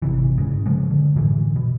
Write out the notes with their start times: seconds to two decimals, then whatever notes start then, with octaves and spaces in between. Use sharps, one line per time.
0.02 G#1 C3 E3
0.38 G#2 C#3
0.66 C#3 F3 G#3
0.91 D3
1.16 A2 D3 E3
1.56 B2